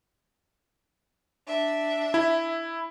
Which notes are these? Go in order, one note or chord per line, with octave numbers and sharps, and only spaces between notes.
D4 E5
E4